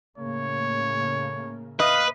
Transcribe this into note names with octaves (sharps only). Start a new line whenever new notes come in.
A2 C#3 A#3 C#5
B4 D#5 F5